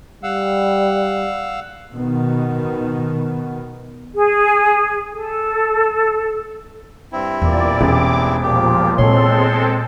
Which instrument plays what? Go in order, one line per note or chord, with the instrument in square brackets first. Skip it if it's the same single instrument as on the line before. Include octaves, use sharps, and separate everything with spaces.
[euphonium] G3 [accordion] F5 F#5 E6
[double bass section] B2 D#3 B3
[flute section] G#4
A4
[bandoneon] G2 C4 E4
[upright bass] E2 [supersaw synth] A#2 D5
[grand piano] E1 [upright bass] C#4 [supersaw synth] D6
[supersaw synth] A#2 F3 [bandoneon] G4
[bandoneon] E2 C6 [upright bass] A#2 [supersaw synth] G#3 C4 A4 [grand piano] C#5